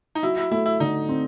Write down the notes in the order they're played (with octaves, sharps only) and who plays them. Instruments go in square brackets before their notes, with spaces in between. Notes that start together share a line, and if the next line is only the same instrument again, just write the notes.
[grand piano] D#4
[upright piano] F#3 [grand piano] E4
[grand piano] E4
[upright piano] A3 [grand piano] E4
[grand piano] E4
[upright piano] D3 [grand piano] D#4
[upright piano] C4